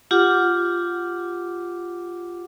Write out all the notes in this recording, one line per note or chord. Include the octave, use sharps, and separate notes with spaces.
F4 G4 F#5 D6